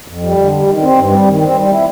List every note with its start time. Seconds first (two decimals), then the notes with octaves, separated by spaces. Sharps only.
0.08 F2
0.23 G3
0.37 D3
0.52 G3
0.66 D#3
0.82 C4
0.96 G2
1.11 G3
1.26 D#3
1.42 C4
1.56 G3
1.71 E4